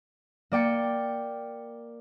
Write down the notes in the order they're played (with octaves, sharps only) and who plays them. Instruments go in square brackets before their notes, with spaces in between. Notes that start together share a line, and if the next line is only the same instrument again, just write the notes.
[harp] A#3 D5 G5 C#7